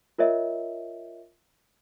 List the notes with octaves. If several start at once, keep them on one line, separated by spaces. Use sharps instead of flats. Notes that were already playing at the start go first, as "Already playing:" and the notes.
F4 A#4 C#5 D#5 E5